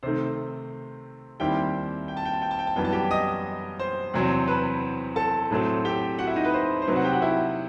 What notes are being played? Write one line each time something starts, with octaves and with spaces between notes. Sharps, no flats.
C3 D#3 A3 C5
D#2 D#3 G3 C4 E4 G4 G5
G5
A5
G5
A5
G5
A5
G5
A5
F#2 E3 G3 B3 G5
A5
G4 G5
D#5 D#6
C5 C6
E2 C3 F#3 C4
B4 B5
A4 A5
A2 F#3 A3 C4
G4 G5
F#4 F#5
E4 E5
D#4 D#5
B4
C5
C5
C3 F#3 C4 D#4 B4
F#4 F#5
G4 G5
F#4 F#5
E4 E5